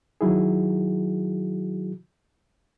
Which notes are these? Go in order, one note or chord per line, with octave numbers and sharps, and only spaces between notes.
D#3 F#3 E4 F#4 G#4